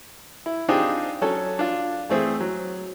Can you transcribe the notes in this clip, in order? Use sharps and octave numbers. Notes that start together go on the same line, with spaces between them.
E4
C4 D4 D#4 F4 G4 G#4
F#3 C#4 A4
D4 F4
E3 A3 C4 G#4
F#3